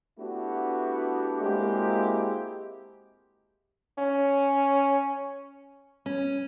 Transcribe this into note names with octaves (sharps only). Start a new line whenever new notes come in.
A3 B3 D4 E4 F#4 G4
G#3 A#3 C4 E4 F#4 G4
C#4
C#4